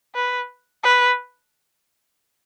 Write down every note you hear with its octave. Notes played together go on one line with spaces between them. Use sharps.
B4
B4